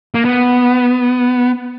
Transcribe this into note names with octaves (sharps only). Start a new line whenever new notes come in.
A#3
B3